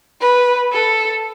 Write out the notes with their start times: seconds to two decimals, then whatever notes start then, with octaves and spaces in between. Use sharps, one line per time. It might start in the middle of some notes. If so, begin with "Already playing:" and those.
0.21 B4
0.72 A4